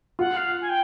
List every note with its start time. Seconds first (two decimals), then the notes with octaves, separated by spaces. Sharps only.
0.19 F4 F#5
0.36 F5
0.61 G#5
0.69 G5